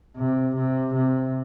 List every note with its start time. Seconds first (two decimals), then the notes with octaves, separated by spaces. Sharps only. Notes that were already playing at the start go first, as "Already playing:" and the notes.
0.16 C3
0.56 C3
0.94 C3